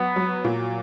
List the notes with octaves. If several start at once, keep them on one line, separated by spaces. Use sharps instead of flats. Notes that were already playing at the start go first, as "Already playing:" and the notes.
Already playing: F#3 B3
F#3
A#2